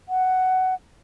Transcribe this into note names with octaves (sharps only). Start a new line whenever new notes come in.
F#5